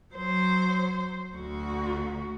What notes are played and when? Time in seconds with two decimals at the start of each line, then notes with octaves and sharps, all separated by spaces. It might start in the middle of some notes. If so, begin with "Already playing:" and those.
0.14 F#3 C5
1.36 D2 F#4